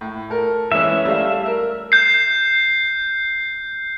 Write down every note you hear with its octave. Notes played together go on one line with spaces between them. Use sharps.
A2
A4 A#4
E3 G#3 C#4 E5
G3 A3 F5
A#4
G6 C7